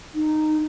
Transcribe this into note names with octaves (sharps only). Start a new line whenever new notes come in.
D#4